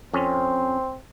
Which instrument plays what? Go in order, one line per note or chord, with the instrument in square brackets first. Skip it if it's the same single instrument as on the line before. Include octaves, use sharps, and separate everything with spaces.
[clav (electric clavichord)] F2 C#4 [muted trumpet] C4